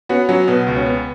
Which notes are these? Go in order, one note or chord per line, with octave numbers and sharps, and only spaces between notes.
B3 C#4 F#4
F#3 C#4 F#4
B2 B3
C#2
C#4
B3